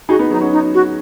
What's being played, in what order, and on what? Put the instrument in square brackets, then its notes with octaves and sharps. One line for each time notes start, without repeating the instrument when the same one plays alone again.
[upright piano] D#4 G#4 [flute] F#4
[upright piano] B3 D#4
[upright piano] F#3 B3 [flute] D#4
[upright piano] C#4 F#4
[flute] D#4
F#4